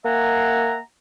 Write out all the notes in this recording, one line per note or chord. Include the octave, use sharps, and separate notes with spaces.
A#3 E5 F#5 G#5 A#5